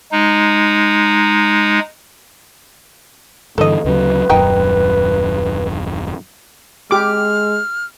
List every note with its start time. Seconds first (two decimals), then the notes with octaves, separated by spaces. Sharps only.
0.12 G#3 D#4
3.58 G2 D3 E3 A4 D#5
3.84 D2 C#3 F#3 B4
4.29 D#1 F#2 D#3 D#4 G5
6.91 G#3 G4 D6 F6